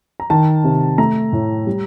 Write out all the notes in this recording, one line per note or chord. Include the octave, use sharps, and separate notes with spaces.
A#5
D#3 A5
C3
A3 A#5
A2
G3